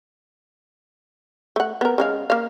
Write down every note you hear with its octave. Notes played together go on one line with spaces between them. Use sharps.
A3 F#5
B3 A#4
C#3 G#3 F5
A#3 F5